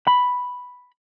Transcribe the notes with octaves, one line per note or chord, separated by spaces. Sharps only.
B5